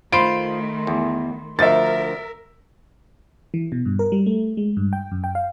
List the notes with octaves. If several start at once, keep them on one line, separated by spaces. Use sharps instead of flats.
D#3 A3 F4 C5 B5 C6 D7
E2
D2 F3 A#4 E5 A6
E3
B2
G2
A#4
G3
A3
G#3
G2
G5
F#2
G5
F5